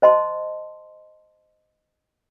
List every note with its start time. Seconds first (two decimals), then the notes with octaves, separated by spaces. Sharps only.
0.02 C5 D#5 A5 C6